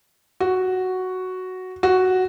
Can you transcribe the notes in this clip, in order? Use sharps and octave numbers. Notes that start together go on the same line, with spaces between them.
F#4
F#4